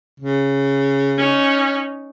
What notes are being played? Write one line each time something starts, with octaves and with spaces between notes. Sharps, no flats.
C#3
C#4 D#4